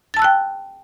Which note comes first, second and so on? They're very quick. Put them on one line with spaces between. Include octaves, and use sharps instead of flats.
A6 A5 E6 F#6 G5